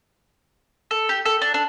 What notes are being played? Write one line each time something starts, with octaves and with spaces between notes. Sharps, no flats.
A4
G4
A4
D4
D4